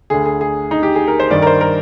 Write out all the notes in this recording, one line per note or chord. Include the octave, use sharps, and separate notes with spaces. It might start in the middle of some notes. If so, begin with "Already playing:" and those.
D2 D3 G#4
G#4
G#4
D#4
G4
G#4
A#4
C5
G2 D#3 D5
A#4
C5
A#4